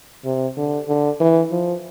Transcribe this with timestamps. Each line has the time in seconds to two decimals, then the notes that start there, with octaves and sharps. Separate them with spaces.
0.25 C3
0.57 D3
0.88 D3
1.20 E3
1.51 F3